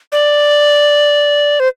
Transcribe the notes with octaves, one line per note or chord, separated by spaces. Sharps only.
D5
C5